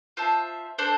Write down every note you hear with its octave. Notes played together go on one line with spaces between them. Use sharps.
F4 C5 E5 A5
D4 A4 C5